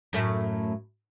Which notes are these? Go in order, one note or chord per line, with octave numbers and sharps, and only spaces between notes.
F#2 A2 A3